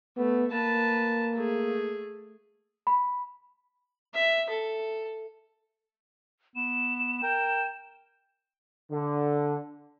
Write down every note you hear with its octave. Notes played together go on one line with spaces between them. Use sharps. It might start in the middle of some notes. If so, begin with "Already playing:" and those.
A3 B3
A#3 B4 A5
A3 G#4
B5
E5
A4
B3 E7
A#4 G5
D3